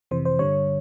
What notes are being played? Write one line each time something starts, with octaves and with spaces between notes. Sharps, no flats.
F2 C3 E3 C5
C5
G2 D3 G3 C#5